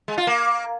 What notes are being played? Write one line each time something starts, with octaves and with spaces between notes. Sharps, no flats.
G#3
F4
A#3